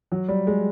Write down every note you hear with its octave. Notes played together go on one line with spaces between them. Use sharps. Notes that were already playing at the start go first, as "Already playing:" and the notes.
F#3
G3
G#3